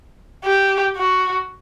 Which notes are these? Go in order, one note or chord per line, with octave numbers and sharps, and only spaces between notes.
G4
F#4